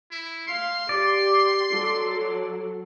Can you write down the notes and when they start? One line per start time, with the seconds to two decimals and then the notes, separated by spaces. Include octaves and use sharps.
0.11 E4
0.47 F5 C6
0.89 G4 D5
1.69 F#3 A4